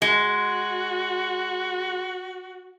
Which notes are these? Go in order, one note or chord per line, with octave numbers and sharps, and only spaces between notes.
G#3 F#4